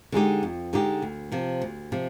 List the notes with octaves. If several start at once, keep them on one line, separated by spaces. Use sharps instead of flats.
D3 G#3 D#4 G4
F2
D3 G#3 D#4 G4
D2
C3 F3
D2
C3 F3